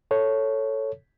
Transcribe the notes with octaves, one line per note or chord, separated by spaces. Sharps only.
A4 C#5